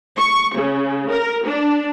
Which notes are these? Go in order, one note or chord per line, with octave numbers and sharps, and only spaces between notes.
C#6
C#3
A#4
D4